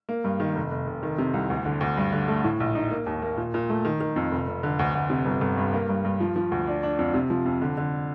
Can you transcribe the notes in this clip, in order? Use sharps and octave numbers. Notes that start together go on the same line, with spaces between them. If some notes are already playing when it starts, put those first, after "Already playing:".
A#3
G2
D#3
F1
F1
F1
D#3
C3
C2
D2
D3
D2
G2
D3
A3
A2
A#1
D#4
A#3
D#2
A#3
A#2
A#2
A3
D#3
D#3
F2
F1
F1
D3
D2
D2
C3
G1
G1
G2
A#3
G2
G2
F3
F3
D2
D4
D4
F2
C3
F3
F2
D3
D3